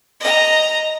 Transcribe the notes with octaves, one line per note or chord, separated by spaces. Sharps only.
D#5 A#5